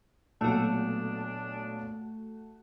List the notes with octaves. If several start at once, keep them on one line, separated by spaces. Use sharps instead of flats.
B1 A#2 A3 D4 F#4